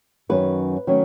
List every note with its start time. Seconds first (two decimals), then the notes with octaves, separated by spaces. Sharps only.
0.29 F#2 D#3 F#3 C#4 B4
0.87 D#3 F#3 A3 C#4